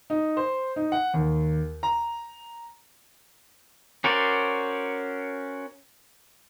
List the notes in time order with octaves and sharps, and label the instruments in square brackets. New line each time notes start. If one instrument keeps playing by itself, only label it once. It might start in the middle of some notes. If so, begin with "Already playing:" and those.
[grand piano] D#4
C5
D#4
F#5
D#2
A#5
[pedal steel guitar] C#4 F#4 A#4 C5 D5